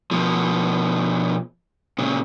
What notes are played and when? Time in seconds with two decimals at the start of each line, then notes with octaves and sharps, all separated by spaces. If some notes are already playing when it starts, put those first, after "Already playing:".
0.11 B2 F3
1.98 A#2 C#3